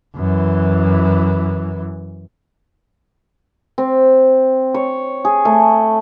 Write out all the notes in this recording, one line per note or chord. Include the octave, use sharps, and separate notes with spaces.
F#2 E3
C4
C#5
G#4
A3